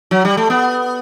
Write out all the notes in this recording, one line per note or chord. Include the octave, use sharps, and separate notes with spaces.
F#3
G3
A3
B3